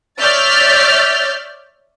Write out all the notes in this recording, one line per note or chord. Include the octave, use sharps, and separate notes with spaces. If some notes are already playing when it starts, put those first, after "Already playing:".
C#5 D5 E5 F6 G6 A6